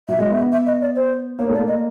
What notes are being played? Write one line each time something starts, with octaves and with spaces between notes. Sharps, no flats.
F#3 E5
G#3 D#5
B3 E5
B3
E5
D#5
D5
C5
A#3 C#5
A3 D5
A#3
D#5